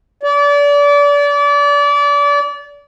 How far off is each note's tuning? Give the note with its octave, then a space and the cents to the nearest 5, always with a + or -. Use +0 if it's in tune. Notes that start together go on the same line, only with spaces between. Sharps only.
D5 -30